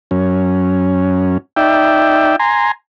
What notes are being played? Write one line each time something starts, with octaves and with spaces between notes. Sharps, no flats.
F#2 C#4
D#4 D5 E5 G5
G#5 A#5 C6